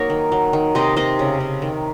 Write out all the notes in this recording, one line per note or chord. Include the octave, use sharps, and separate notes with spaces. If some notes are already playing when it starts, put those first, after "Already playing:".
Already playing: F#3 A#3 D#4 A#4 C#5 D#5
D#3
F#3
D#3
C3 C5 D#5
C3 C5 D#5
C#3
C#3
D#3